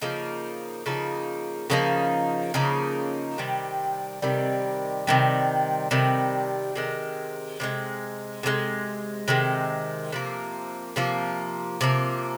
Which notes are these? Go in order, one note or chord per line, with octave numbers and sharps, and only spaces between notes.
C#3 F3 A#3 D#4
C#3 F3 A#3 D#4
C#3 F3 A#3 D#4
C#3 F3 A#3 D#4
C3 D#3 G3
C3 D#3 G3
C3 D#3 G3
C3 D#3 G3
C3 D#3 G#3
C3 D#3 G#3
C3 D#3 G#3
C3 D#3 G#3
C3 F3 A#3
C3 F3 A#3
C3 F3 A#3